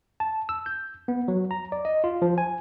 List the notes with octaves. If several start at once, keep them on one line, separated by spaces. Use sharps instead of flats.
A5
E6
G6
B3
F#3
A#5
D5
D#5
F4
F3
G#5